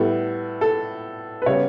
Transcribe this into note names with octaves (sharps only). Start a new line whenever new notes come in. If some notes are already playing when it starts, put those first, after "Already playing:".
Already playing: A2 G3 B3 A4
A4
B4
C#3 G3 B3 C#5